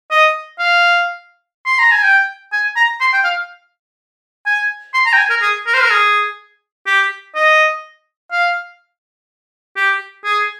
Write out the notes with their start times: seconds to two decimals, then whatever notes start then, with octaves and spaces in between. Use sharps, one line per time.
0.11 D#5
0.59 F5
1.66 C6
1.79 A#5
1.91 G#5
2.04 G5
2.53 G#5
2.76 A#5
3.01 C6
3.13 G5
3.24 F5
4.46 G#5
4.94 C6
5.06 A#5
5.13 G5
5.18 G#5
5.30 A#4
5.42 G#4
5.66 A#4
5.74 C5
5.82 A#4
5.91 G#4
6.87 G4
7.35 D#5
8.32 F5
9.76 G4
10.24 G#4